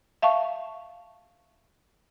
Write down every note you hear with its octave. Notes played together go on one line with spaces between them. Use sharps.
E5 F5 A5 C#6